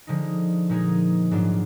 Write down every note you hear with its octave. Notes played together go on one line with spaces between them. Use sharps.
D3 F3 G#3 D#4
A#2 F3 G#3 D#4 G#4
G#2 F#3 D4 F4